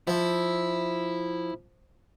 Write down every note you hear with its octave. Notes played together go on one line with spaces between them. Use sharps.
F3 E4